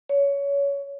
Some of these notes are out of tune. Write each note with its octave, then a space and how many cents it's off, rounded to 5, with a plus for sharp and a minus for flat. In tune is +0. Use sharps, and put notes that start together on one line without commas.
C#5 +20